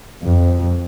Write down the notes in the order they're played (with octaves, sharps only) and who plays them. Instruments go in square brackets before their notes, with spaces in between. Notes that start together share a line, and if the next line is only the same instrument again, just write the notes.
[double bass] F2